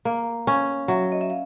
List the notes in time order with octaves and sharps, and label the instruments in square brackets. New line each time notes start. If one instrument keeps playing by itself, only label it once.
[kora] A#3 [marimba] F5
[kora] C#4 [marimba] F5
[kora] F#3 [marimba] E5
[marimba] D#5
E5
F5